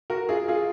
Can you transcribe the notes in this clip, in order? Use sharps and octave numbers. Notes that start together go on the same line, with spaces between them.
F#4 A#4
F4 G#4
F4 G#4